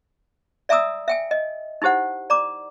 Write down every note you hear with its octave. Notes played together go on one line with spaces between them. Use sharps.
D5 E5 G#5 A#5 D#6 E6
E5 G5 G#5
D#5
D#4 E4 G4 C5 F#5
D5 A#5 D6